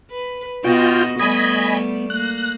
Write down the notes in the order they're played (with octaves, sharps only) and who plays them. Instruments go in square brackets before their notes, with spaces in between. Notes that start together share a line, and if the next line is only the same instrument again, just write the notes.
[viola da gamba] B4
[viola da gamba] B2 F#4 D#5 [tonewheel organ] F4 G5
[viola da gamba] G3 A3 B3 [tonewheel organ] D#5 G#5 B5
[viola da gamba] A#3 [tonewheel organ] F#6